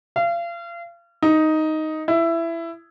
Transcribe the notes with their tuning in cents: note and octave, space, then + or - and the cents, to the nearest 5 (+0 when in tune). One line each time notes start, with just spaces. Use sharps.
F5 -35
D#4 +5
E4 +15